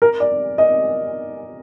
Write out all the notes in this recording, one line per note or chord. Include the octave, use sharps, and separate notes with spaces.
A#4
D5
D#5